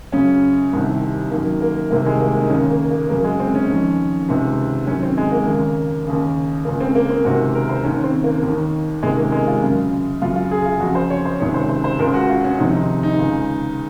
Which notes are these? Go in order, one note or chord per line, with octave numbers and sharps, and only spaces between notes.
F#2 C#3 C#4
C2 C3 D#3
F#2 D#3 A#3
A#3
C2 C3 D#3 A#3
G#3
A#3
D#4
D#2 C#3 C#4
A#3
A#3
F#2 C#3 A#3
G#3
C4
C#4
F2 D#3
C#2 C3 D#3
F#2 D#3 C#4
C4
G#3
A#3
D#2 C#3
D#2 C#3
C#2 C#3 A#3
C4
A#3
C4
C#2 C3 D#3 F#4
A#4
C5
D#2 D#3 C#4
C4
A#3
D#2 D#3
C#2 C3 D#3 G#3
A#3
G#3
F4
F#2 C#3
F#2 C#3 F4
F4
G#4
F4
F2 C#3 F#4
C5
C#5
C5
C#2 C3 D#3 C#5
C5
C5
C5
C#2 C#3 A#4
F#4
F4
C#4
F2 C3 D#3 D#4
D#4
D#4
C#2 C#3